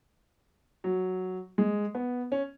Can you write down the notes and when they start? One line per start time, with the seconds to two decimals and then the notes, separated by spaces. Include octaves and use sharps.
0.84 F#3
1.58 G#3
1.95 B3
2.32 C#4